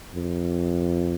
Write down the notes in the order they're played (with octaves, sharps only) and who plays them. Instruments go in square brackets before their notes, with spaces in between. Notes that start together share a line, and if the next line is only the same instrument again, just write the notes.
[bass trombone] F2